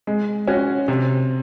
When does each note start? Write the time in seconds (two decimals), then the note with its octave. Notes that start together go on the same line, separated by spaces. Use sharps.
0.07 G#3
0.47 C#4 F#4
0.88 C3